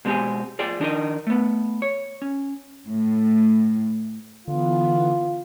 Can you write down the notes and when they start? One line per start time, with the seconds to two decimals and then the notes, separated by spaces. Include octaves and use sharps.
0.05 B2 G#3 C4 C#4 G4 G#4
0.59 F4 G#4 D5 G5
0.80 D#3 D4 D#4 A#4 D#5
1.27 A3 B3
1.82 C#5
2.22 C#4
2.87 A2
4.48 D3 E3 B3 F4